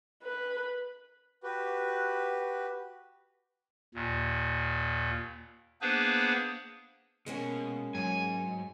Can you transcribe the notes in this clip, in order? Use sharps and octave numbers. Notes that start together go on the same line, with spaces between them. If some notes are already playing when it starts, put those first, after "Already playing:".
B4
F#4 G4 B4
D#2 A#2
A#3 B3 D4 G#4 B4 C5
B2 G#3 A#3 C#4
G#2 F#3 G#5